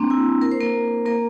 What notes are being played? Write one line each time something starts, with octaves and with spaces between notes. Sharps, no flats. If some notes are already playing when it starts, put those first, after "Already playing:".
Already playing: A#3 C4 D4
E4
A#4
C5
A#3 A#4
A#3 A#4